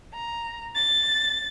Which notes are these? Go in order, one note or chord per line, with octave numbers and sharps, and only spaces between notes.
A#5
A6